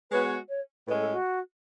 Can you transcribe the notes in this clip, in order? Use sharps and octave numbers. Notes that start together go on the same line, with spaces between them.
G#3 B3 F#4 B4 C#5
C#5
A2 G#3 C#4 B4
A4
F#4